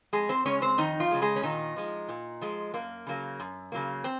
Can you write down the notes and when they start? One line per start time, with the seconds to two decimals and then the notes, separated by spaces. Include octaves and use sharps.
0.13 F2 G#3 G#4
0.29 C4 C5
0.45 C#3 G#3 C#4 C#5
0.62 C4 C5
0.78 F2 D#3 D#4
1.00 F3 F4
1.11 G#3
1.14 C#3
1.22 G#3 G#4
1.36 C#4
1.43 A#2 D#3 D#4
1.76 F3 G#3
2.09 A#2
2.42 F3 G#3
2.74 F#2 A#3
3.07 C#3 F#3 A#3
3.40 F#2
3.72 C#3 F#3 A#3
4.04 C4